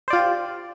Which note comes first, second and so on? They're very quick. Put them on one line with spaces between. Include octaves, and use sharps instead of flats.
C5 D5 F4 G4